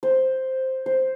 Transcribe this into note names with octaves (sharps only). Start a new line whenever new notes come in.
C5
C5